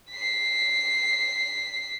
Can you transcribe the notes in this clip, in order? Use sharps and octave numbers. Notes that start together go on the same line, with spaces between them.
B6 C7